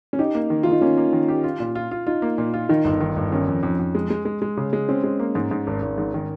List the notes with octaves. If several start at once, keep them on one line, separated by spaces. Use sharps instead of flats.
C#4
D#4 G4
A#3
D#3
D#3 F4
D#4
A#3 C#4
A#3
D#3
G4
F4
A#2
F4
F4
D#4 F4
A#3
A#2
F4
D#3 D#4
G1
D#3
G1
D#3 C#4
F2
F2
F2
G#3
G#3
G#3
G#3
C#3
G#3
C4 C#4
G#3
A#3
G#2
G#2
G#1
G#1
G#2
D#3